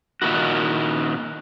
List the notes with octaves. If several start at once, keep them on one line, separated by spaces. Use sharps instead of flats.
A#2 D#3 E4 F#4